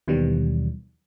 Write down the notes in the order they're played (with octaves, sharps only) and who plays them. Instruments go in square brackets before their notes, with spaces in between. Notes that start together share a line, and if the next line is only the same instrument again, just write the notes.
[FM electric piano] D#2 B2 D#3 E3 F#3 G3